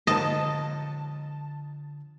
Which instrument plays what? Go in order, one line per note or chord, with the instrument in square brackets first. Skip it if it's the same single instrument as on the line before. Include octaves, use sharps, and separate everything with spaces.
[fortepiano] D#2 G#2 A#3 [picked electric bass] D3 F3 [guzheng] D#5 [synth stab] A5